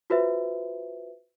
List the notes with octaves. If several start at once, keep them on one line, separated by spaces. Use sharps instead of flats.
F4 F#4 B4 C5 E5